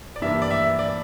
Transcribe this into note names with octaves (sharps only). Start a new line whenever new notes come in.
D5
G2 E3 G3 A#3 E5
D5
E5
D5